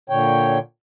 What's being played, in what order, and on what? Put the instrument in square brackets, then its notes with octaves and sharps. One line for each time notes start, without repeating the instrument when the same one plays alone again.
[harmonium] A#2 D3 C#5 G5